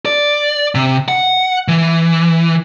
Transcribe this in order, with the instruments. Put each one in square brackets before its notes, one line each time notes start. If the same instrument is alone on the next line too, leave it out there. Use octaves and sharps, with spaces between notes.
[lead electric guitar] D5
C3
F#5
E3